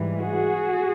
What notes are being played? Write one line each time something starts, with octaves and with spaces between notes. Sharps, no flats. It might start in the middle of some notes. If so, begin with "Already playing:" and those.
Already playing: G#2 E3 G3
F#4 G#4